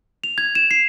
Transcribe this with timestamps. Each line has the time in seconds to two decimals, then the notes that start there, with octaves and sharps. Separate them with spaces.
0.24 F7
0.38 G#6
0.55 E7
0.71 C7